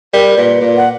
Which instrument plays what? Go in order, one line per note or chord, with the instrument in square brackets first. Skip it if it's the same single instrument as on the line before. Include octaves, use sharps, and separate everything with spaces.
[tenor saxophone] G3 [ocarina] A#4
[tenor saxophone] A#2 [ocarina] B4
[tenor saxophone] A#2
[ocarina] F#5